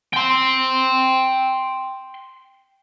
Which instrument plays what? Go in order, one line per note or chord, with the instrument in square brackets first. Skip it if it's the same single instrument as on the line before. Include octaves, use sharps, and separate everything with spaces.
[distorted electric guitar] G5 C6